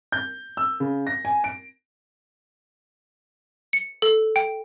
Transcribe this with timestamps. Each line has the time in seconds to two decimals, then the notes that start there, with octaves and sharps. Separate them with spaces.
0.12 G6
0.57 E6
0.80 C#3
1.07 A#6
1.25 G#5
1.44 D7
3.73 C#7
4.02 A4
4.36 G5